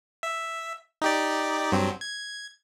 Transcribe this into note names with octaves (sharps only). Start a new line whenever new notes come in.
E5
D#4 G4 D5
G2 F#3 C4
G#6